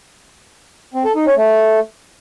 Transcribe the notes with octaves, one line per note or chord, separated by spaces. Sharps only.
C4
A4
D#4
C#4
A3